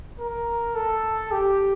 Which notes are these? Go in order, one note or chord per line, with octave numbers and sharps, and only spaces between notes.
A#4
A4
G4